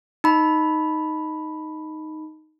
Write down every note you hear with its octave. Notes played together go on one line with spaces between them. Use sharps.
D#4 B5